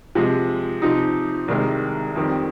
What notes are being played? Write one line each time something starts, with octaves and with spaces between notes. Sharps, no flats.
C3 F3 G#3
C3 F3 C4 D#4
C2 C3 D#3 G#3
F2 D#3 G3 C4